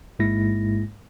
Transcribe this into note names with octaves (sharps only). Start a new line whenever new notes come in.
A1 G#2 G#3 A#3 E4 A#6